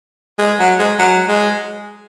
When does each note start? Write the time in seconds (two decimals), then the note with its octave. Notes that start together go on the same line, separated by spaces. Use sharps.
0.39 G#3
0.59 F#3
0.79 G#3
0.99 F#3
1.29 G#3